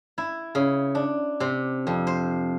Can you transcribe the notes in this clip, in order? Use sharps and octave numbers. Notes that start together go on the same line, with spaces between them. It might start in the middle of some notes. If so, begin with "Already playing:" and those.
E4
C#3
D4
C3
F2
C5